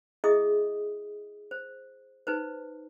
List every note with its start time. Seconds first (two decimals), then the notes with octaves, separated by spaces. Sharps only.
0.24 E4 G#4 D#5 E5 D#6
1.51 C5
2.27 D#4 B4 C5